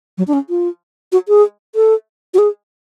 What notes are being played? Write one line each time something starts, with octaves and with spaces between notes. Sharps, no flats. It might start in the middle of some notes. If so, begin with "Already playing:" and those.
F#3
D4
C#4
F4
F#4
G#4
A4
F#4
G#4